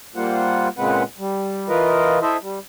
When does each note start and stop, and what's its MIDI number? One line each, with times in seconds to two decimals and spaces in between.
0.16 0.68 55
0.16 0.68 58
0.16 0.68 65
0.16 0.68 72
0.16 0.68 78
0.78 1.03 46
0.78 1.03 49
0.78 1.03 56
0.78 1.03 60
0.78 1.03 71
0.78 1.03 78
1.19 1.68 55
1.69 2.19 52
1.69 2.19 65
1.69 2.19 70
1.69 2.19 71
1.69 2.19 75
2.22 2.37 64
2.22 2.37 69
2.22 2.37 72
2.22 2.37 75
2.22 2.37 76
2.42 2.59 55